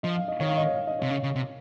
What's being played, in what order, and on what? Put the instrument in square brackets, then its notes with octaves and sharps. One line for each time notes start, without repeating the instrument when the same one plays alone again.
[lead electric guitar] F3 [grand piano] D#5
[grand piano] F5
D#5
[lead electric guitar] D#3 [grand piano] C#5
[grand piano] F5
D#5
C#5
F5
D#5
[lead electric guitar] C3 [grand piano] C#5
[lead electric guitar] C#3
C#3
C3